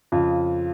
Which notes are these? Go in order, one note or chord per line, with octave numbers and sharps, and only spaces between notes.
F2 C#3 F3 F4